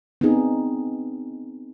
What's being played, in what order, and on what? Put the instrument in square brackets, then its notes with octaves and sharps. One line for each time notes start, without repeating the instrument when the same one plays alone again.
[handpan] B3 C4 D4 D#4 G#4